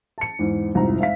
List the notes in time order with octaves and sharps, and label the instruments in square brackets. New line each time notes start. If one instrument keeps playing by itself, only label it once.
[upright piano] A5 C#7
E2 G#2
F1 C2 G#2 F3 E4 A#5
G#2 E5 F5 B6